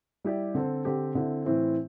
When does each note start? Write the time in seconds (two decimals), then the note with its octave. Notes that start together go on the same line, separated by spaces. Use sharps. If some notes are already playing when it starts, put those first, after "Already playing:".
0.24 G3 E4 G4 D5
0.55 D3 C4 A4 C5
0.85 D3 C4 G4
1.15 D3 C4 E4
1.45 A2 E3 C4 E4 C5